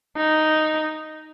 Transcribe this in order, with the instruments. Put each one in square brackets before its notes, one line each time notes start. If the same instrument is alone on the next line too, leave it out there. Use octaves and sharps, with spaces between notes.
[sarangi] D#4